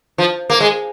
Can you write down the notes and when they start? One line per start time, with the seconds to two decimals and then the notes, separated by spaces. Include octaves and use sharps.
0.18 F3
0.50 A#3
0.60 G#3